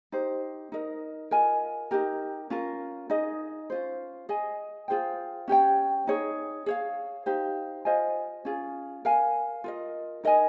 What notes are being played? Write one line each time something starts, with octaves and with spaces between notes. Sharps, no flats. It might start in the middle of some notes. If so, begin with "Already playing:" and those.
D#4 G4 C5
D#4 A#4 D#5
F4 A#4 D#5 G#5
D#4 G4 A#4
C#4 F4 A#4
D#4 G#4 D#5
C#4 F4 C5
G#4 D#5 G#5
F4 G#4 C5 G5
C#4 G4 C#5 G5
D#4 G#4 C#5
G#4 C#5 F5
D#4 G4 C5 F5
F4 C5 D#5 G#5
C#4 F4 G#4
A#4 F5 G#5
F4 A#4 D#5
D#4 A#4 D#5 G#5